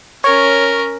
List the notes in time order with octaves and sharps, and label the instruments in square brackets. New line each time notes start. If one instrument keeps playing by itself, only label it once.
[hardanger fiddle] C#4 A#4 [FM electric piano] C#5